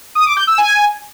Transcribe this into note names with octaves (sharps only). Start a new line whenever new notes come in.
D#6
D6
G6
E6
G#5